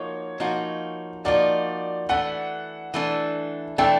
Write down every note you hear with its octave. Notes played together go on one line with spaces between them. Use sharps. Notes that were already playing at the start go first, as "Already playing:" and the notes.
Already playing: F3 A#3 D#4 F#4 C#5
F3 A#3 D#4 F#4
F3 A#3 D#4 F#4 D5
E3 A3 D4 F#5
E3 A3 D4
E3 A3 D4 G5